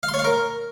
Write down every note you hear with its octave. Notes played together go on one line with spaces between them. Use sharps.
F5
C6
C#5
F5
A#4